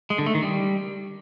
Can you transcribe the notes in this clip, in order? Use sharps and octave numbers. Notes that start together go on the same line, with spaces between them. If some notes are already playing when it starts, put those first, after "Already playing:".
G#3
D3
A3
D#3
G3